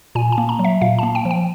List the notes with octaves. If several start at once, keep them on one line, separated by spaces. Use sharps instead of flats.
A#2 G#5
A5
A#3
A#5
F#3
E5
A#2 F5
A#3 A5
G5
F3
G5